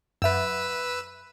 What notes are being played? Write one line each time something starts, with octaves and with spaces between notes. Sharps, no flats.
F#2 B4 E5 E6